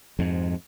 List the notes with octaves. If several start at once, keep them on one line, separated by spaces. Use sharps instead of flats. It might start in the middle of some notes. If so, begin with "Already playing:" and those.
F2 G#2